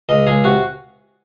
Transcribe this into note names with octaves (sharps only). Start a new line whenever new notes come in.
C#2 D#5
C#2 G#4
C3 F#4